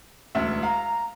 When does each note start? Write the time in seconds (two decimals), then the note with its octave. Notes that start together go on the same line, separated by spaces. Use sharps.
0.35 E1 D2 E5
0.63 F5 A#5